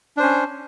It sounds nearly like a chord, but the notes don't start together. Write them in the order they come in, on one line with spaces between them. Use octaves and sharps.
D4 C5 C#4